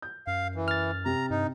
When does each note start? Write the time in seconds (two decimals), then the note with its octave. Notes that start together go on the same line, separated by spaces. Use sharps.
0.02 G6
0.27 F#2 F5
0.55 E3
0.68 F6 A6
1.06 C3 A#5
1.30 G2 D#4